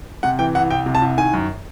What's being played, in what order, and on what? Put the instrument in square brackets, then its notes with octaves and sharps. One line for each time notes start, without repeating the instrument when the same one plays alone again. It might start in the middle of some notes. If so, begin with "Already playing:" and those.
[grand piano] C3 F#5
E3 G5
C2 F#5
C2 G5
C3
A5
C2
D#3 G#5
F#2